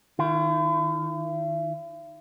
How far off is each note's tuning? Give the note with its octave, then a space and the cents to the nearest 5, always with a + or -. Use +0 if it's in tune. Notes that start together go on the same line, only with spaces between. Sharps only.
D#3 +0 E4 +45